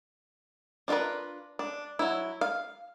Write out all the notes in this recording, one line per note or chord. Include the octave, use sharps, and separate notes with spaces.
D4 F4 F#4 A#4 B4
D4
F#3 E4
F5